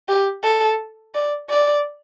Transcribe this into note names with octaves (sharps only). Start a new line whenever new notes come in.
G4
A4
D5
D5